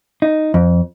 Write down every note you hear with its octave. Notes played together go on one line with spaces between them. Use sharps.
D#4
F2